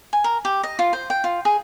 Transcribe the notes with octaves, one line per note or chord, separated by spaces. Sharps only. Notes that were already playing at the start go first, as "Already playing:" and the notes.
G#5
A#4
G4
D#5
F4
C5
G5
F4
G#4